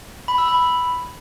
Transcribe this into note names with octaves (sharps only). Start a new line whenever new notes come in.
B5
E6
B5